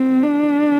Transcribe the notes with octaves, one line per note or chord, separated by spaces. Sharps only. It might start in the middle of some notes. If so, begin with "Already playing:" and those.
Already playing: C4
D4